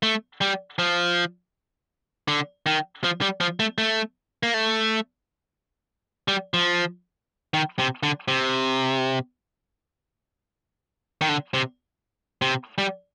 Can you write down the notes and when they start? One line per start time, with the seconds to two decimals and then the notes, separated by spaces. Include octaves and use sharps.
0.03 A3
0.41 G3
0.79 F3
2.28 D3
2.66 D#3
3.04 F3
3.21 G3
3.40 F3
3.60 A3
3.78 A3
4.43 A#3
4.54 A3
6.28 G3
6.54 F3
7.54 D#3
7.79 C3
8.03 D3
8.28 C3
11.21 D#3
11.29 D3
11.54 C3
12.42 C3
12.78 G3